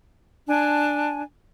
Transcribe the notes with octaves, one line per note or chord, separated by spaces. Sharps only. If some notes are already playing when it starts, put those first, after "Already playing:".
D4 G#5 A5